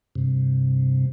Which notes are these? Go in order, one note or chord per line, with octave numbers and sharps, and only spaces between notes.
G2 C3